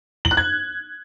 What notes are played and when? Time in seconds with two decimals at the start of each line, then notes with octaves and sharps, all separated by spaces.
0.25 F#7
0.31 F#6
0.37 G#6